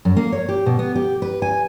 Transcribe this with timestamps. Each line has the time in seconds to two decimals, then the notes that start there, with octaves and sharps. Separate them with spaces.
0.05 F#2
0.17 A#3
0.32 C#5
0.49 G4
0.66 B2
0.79 B3
0.95 G4
1.22 B4
1.42 G#5